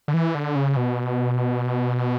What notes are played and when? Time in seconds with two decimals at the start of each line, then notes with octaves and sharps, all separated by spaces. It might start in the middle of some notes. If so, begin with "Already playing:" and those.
0.08 D3
0.14 E3
0.35 D3
0.55 C#3
0.77 B2